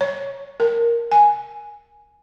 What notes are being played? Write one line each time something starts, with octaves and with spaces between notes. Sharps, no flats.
C#5
A#4
G#5